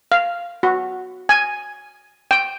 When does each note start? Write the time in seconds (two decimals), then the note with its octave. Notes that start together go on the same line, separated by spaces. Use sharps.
0.12 F5
0.63 F#4
1.29 G#5
2.31 G5